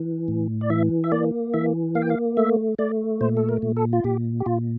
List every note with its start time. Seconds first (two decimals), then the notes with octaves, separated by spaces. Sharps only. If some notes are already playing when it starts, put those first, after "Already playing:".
Already playing: E3
0.28 A2
0.61 D5
0.70 E3 E5
1.04 E5
1.12 A#3 D5
1.54 E3 E5
1.95 A#3 F5
2.02 G5
2.10 F5
2.37 A3 E5
2.79 A3 D5
3.21 A#2 C5
3.37 A4
3.49 A#4
3.62 A#2
3.77 A4
3.93 F4
4.04 A#2 G4
4.40 G4
4.46 A#2 F4